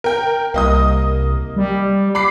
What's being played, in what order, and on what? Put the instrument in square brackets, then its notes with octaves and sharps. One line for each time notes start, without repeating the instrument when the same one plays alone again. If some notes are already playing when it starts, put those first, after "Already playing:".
[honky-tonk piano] A#4 G5
[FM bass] C2 [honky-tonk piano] A#3 D#5 D#6
[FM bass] G3
[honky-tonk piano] B5 D6 C7